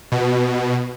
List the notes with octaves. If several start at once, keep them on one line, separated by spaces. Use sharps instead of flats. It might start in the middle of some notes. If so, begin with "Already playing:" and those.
B2